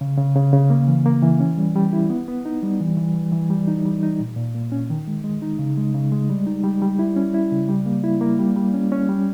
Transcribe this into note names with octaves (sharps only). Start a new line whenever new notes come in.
C#3
C#3
C#3
C#3
A#3
E3
A#3
E3
C#4
G3
G3
E4
B3
B3
D#4
G3
E3
E3
E3
E3
G3
D#4
G3
D#4
A#2
A#2
A#3
C#4
D#3
G#3
G#3
D#4
C#3
G#3
C#3
G#3
G3
D#4
G3
G3
E4
C#4
E4
C#3
G3
A#3
E4
A#3
G3
G3
C#4
C#4
G3